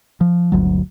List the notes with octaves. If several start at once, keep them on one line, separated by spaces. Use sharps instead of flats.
F3
G1 D2 F#3